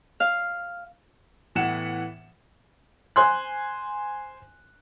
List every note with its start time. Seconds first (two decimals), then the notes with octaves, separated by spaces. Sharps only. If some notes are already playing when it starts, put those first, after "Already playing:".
0.20 F5
1.55 A2 E3 B3 F#5 E7
3.16 C5 G#5 C6 F#6